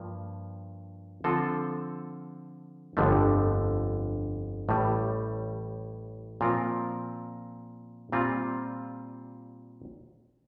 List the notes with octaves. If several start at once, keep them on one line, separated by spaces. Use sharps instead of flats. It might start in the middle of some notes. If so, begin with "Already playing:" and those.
Already playing: G2 F3 A#3
D3 F3 C4 F4 A4
G1 F2 D3 F3 A3
A1 A2 G3
A#2 F3 C4 F4 A#4
A#2 G3 C4 F4